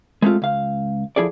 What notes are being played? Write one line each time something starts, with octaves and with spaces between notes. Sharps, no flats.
G#3 A3 C4 F4
C#2 F5
F3 E4 G#4 A4 D5